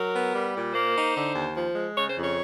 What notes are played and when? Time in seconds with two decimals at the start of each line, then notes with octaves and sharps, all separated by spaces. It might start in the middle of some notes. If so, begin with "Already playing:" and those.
Already playing: F#3 A#4
0.13 B3
0.34 G3
0.54 A#2
0.74 A#3 C5
0.95 D#4
1.15 D3
1.35 D#2
1.55 F3
1.75 G#3
1.96 C#3 C#5
2.09 C5
2.16 F2
2.23 C#5